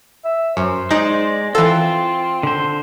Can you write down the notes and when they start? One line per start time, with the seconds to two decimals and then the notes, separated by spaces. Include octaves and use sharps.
0.25 E5
0.57 F#2 C5
0.91 G#3 D#4 D5
1.55 E3 C4 F4 A4
2.43 D3 C5